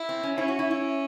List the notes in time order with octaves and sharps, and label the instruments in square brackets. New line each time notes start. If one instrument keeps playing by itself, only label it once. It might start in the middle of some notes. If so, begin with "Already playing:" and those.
Already playing: [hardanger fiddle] E4
[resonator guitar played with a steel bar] C4
C#4
[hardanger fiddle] C#4 [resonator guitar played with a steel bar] E4
[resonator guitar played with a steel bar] F#4
E4
E4